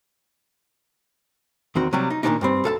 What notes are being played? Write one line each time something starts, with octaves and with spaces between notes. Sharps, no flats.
E2 D#3 C4 F#4
C3 F#3 G3
D#4
A#2 D#3 E3 G#3 D4 D#4
G2 G3 C4
B1 A4 F5 A5